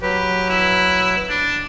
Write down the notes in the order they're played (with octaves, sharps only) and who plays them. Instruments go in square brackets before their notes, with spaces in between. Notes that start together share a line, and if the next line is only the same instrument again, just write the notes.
[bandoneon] F#3 B4 [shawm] G4
[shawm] E4
D4